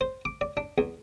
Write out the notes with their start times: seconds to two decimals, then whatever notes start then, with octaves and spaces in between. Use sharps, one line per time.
0.01 C5
0.25 D6
0.41 D5
0.57 D4
0.78 E2